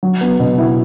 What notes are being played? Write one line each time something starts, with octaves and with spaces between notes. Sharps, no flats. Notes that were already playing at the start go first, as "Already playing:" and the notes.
F#3
B3
B2
E4